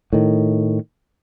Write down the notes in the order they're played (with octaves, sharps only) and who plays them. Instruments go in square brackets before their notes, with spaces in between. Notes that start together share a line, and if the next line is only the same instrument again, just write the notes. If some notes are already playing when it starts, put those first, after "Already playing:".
[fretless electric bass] A2 D#3